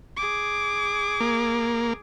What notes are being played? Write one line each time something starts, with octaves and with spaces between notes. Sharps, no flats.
G#4 D6
A#3